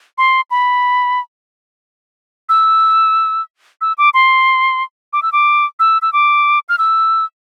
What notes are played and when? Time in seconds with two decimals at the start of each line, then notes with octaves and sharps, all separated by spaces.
0.18 C6
0.51 B5
2.49 E6
3.81 E6
3.98 D6
4.14 C6
5.13 D6
5.23 E6
5.32 D6
5.80 E6
6.02 E6
6.13 D6
6.69 F6
6.78 E6